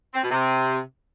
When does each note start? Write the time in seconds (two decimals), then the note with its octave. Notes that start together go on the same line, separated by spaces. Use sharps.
0.14 C4
0.23 B2
0.31 C3